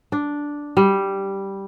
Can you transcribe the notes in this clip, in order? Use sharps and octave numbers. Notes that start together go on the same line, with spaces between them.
D4
G3